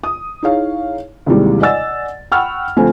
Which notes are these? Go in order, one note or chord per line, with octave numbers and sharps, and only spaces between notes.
D#6
D#4 E4 G#4 C#5 F5
D#2 G#2 C3 E3 G3 G#3
D5 D#5 F#5 G#5 E6 A6
F#5 G5 B5 C#6 E6 F6
D2 F3 A3 C4 G#5